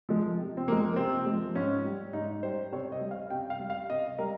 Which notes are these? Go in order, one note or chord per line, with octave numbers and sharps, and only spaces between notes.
F3 G#3
C3
C4
F3 G#3 A#3
C3 C4
F3 G#3
G#2 C#4
G3
G#2 D#4
G3 C5
C3 C#5
D#5
G3
F5
C3 G5
F5
G3
F5
C3 D#5
G3 A#4